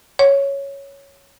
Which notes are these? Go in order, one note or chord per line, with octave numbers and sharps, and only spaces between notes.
C#5